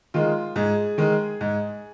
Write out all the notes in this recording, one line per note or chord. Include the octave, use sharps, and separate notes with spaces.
D#3 G#3 F4
G#2 G#4
D#3 G#3
G#2